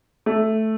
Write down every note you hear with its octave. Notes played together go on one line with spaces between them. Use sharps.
A3